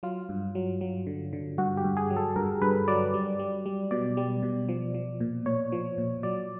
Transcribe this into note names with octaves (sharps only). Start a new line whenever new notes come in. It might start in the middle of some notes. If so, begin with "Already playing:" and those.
F#3 F4
G2
F#3
F#3
D3
D3
G2 F#4
G4
G2
G#4
F#3
A4
G2 A#4
G2 B4
F#3 D5
G3
G3
G3
B2 D5
G3
B2
F3
F3
A#2
A#2 C#5
F3
A#2
F#3 D5